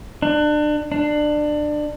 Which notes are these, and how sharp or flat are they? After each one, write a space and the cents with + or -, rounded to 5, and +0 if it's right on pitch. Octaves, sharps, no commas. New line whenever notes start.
D4 +30
D4 +25